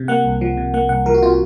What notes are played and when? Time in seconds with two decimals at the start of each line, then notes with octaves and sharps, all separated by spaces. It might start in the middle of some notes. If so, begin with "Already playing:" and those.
Already playing: C3
0.08 A#3 F#5
0.25 C2
0.41 F3
0.57 C3
0.74 A#3 F#5
0.89 C2 F#5
1.06 F3 A#4
1.14 F#4
1.22 C3 F4
1.30 F#4